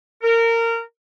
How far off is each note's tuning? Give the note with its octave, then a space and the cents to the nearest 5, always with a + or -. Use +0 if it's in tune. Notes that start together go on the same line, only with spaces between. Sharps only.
A#4 -20